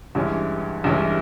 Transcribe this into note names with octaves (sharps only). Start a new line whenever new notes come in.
A1 G2 E3 G#3 C#4
A1 G2 E3 G#3 C#4